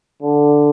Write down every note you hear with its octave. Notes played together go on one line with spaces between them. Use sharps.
D3